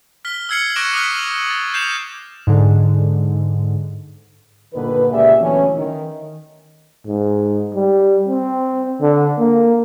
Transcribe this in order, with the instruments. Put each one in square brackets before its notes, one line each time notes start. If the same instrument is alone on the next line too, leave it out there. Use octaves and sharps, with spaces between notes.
[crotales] F6 B6 G7
E6 F6 G#6 C7 C#7 F#7
C#6 D6 F#6 A#6 D7 E7
D6 D#6 F6 F#6 B6 F#7
A6
G6 C7 E7 F7
[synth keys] G#2 D3
[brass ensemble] G1 A#2 D3 D#3 B4
C#2 A#2 G4 G#4 D5 E5
D2 E3 F#3 A3 B3 C#4
D#3
[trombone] G#2
G3
C4
D3
A#3